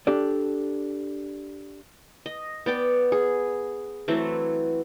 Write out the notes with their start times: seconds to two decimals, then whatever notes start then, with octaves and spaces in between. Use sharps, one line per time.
0.07 D4 G4 A4 D5
2.26 D#5
2.66 B3 D5 G5
3.12 G#4
4.08 E3 F#3 A3 C4